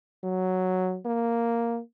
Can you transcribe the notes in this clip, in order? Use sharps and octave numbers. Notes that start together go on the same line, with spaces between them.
F#3
A#3